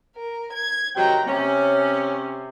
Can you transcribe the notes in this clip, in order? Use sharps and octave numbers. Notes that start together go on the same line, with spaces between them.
A#4
G#6
C3 D#3 F#3 G5 A#5
C3 C#4